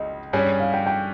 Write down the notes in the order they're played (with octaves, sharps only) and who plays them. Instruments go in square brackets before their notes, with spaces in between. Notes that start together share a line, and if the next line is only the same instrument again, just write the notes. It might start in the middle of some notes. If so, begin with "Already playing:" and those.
Already playing: [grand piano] C#2 C#3 [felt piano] D#5
[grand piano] G2 G3 C#4 G#4 [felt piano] C#5
[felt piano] F5
G5
G5